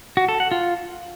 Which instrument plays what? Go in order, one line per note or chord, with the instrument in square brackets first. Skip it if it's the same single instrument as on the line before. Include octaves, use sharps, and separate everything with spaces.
[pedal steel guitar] F#4
A4
F#5
F4